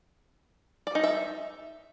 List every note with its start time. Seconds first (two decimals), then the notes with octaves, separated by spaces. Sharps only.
0.87 D5
0.95 D#4
1.04 E5